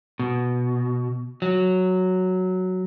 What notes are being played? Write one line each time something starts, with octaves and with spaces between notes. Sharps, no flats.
B2
F#3